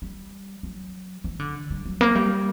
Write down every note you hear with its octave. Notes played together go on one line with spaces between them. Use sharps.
G3
F#3
E3
D3
G3
F#3
A#3
G3